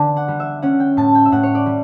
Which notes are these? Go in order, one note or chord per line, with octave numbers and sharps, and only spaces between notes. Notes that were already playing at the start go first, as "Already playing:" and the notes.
Already playing: D3 B3 D4 D5 A5
F#5
G3
E5
C#4 F#5
G5
A2 A5
G5
E5
A2 F#5
C#5
D5
G3